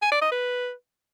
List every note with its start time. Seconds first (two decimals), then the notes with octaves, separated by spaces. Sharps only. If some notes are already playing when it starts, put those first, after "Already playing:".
0.02 G#5
0.12 D5
0.22 D#5
0.32 B4